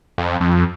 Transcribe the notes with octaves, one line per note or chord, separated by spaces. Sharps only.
F2
F2